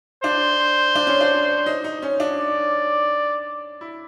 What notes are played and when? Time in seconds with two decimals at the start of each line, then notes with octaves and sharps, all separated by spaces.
0.24 D4 C5
0.95 D4
1.07 C#4
1.21 D4
1.66 D#4
1.84 D#4
2.02 C#4
2.20 D4
2.38 D5
3.81 E4